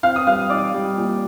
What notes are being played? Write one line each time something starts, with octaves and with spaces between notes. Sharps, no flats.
C4 F5 F6
D#6
G3 F5 F6
D#4 D5 D6
G3
A#2